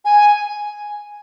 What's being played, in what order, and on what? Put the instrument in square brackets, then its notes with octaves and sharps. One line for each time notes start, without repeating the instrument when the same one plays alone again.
[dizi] G#5